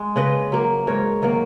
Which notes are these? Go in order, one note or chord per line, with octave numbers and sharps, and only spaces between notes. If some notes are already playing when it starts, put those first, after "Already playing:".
Already playing: G#3
C#3 B4 D#5
F#3 A#3
G#2 A#4 C#5
D#3 F#3 A#3